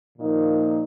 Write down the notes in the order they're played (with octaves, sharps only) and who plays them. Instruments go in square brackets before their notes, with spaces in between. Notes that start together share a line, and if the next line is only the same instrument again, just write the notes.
[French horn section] A#2 F3 A#3 D#4